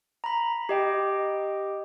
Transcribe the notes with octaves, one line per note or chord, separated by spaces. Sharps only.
A#5 B5
G4 D#5 G5